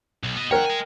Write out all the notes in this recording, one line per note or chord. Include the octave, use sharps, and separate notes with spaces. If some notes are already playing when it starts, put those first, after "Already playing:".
B1
B3 D#5
A#4 C#5 F#5 G5
D#5 G#5